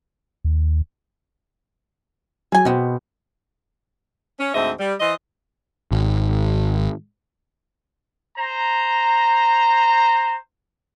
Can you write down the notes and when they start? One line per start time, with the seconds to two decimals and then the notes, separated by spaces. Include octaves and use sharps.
0.45 D#2
2.52 F#3 G#4 G#5
2.65 B2 G#3 B3 C4
4.39 C#4
4.54 D2 G#2 C4 D#5 E5
4.80 G3
5.00 E3 C5 D#5
5.92 G#1
8.37 C5 A#5